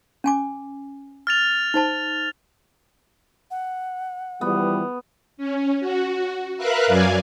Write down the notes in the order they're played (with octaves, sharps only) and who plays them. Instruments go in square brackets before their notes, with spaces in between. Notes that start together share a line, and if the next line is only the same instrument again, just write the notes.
[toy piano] C#4 G#5 D6
[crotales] F6 A6 F7
[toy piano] D#4 C5 A5
[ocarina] F#5
[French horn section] E3 F3 G3 [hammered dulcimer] B3
[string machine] C#4
F#4
A#4 B4 E5 F5 F#6
F#2 F#3 D5 F5 G#5 G#6